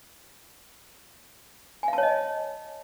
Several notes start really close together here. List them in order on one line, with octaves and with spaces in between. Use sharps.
G#5 F5 A5 C#5 D#5